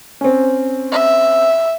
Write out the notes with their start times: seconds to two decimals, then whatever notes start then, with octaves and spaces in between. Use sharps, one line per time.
0.21 C4 C#4
0.91 E5